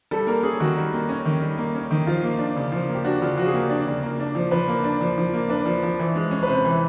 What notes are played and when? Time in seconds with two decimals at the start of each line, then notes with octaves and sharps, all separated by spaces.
0.11 G3 A4
0.27 A#3 A#4
0.43 C#4 G#4
0.60 D#3 F#4
0.76 G3
0.93 A#3
1.09 C#4
1.25 D#3
1.41 G3
1.58 A#3
1.75 C#4
1.91 D#3
2.07 F3 F4
2.23 A#3
2.39 D4
2.56 C#3
2.72 F3
2.88 A#3
2.94 G4
3.05 D4 F#4
3.22 C#3 F4
3.37 F3 F#4
3.46 G#4
3.54 A#3 G4
3.70 D4
3.86 C#3
4.02 A#3
4.20 D4
4.35 F3
4.51 F3 B4
4.68 A#3
4.84 D4
5.01 F3
5.18 F3
5.34 A#3
5.50 D4 B4
5.66 F3
5.83 F3
5.99 E3
6.16 G#3
6.31 C#4
6.43 B4
6.48 C3 C5
6.65 E3